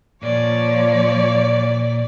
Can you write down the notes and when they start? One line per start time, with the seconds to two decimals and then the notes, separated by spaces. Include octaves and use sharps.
0.22 A#2 F3 C#5 D5